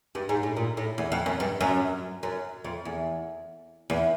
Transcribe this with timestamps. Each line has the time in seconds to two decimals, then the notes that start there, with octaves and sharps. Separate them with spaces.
0.15 G2
0.29 G#2
0.43 A2
0.56 A#2
0.77 A2
0.98 E2
1.12 F2
1.26 F#2
1.40 G2
1.61 F#2
2.23 F#2
2.65 F2
2.85 E2
3.90 E2